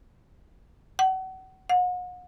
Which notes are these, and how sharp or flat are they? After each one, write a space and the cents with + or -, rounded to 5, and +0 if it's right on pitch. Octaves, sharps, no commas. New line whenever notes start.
F#5 +35
F#5 -40